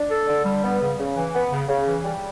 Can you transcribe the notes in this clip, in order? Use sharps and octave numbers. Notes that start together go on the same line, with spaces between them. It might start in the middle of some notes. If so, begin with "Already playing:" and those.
Already playing: D4
A4
D3
G3
B3
C#3
C#3
E3
B3
C#3
C#3
E3
G3